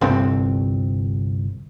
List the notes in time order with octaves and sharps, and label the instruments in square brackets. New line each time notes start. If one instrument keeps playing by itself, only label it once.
[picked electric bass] G1 C2 C4